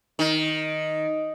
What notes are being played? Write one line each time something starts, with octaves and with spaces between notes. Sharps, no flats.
D#3